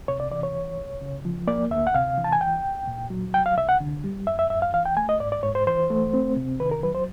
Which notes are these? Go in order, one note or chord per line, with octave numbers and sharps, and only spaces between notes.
C3 C#5
D5
E3 D5
C#5
C2
C2
C#3
F3
A#3 D5
D2 E5
F#5
C3 F5
E3
A5
G#5
D2 G5
D2
A#2
F#3
C2 G5
F5
C2 E5
F#5
D3
G3
F#2 E5
E5
F#2 E5
F5
E3 F5
G5
A3 G#5
D#5
G#2 D5
D5
G#2 C#5
C5
E3 C5
A3
C4
C3
D#3 B4
A#4
F#3 B4
C5